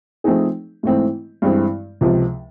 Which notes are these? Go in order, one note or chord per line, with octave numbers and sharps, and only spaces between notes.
F3 A3 C4 D#4 G#4
G#2 E3 A3 C4
G2 E3 G#3 C4
C#2 C3 F3